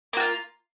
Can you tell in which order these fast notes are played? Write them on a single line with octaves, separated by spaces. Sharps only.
A#3 F#4 F4